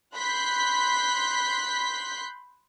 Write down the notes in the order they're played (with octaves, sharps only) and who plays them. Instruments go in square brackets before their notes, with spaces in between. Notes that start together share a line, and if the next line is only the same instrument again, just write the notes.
[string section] B5 C6 F#6 G6 B6 C7